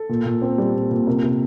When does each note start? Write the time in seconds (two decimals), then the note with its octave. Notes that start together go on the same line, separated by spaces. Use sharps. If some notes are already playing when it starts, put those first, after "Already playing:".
Already playing: A4
0.09 A#2
0.25 A#2
0.42 C4
0.58 G3
0.74 A#2
0.91 A#2
1.07 C3 A#4
1.23 C3